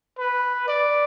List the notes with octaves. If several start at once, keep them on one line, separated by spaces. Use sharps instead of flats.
B4
D5